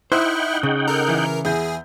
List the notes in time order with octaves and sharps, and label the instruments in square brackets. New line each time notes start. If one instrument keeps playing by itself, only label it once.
[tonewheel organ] D#4 F#5 G5 [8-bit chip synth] E4 [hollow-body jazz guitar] C5 [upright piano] D#6 E6 F#6
[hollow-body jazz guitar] C#3
[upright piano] A4 [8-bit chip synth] A#4
[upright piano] E3
[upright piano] E2 E4 G6 [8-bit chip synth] G#4